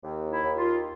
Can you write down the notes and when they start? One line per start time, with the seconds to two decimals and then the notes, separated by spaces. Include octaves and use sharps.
0.03 D#2
0.30 E4
0.43 D#2
0.57 F4